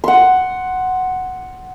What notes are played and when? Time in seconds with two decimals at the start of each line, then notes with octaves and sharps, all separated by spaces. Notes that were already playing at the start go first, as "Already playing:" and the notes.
0.04 F#5 C6